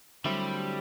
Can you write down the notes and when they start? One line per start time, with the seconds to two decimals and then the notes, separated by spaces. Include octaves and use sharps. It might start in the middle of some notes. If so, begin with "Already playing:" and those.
0.25 D3 F#3 G3 A3 C4 E4